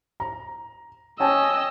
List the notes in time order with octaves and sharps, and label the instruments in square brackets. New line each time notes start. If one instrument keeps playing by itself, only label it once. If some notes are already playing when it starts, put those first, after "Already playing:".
[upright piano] A#5
[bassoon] C#4 [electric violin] D#5 E6 [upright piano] G5 A5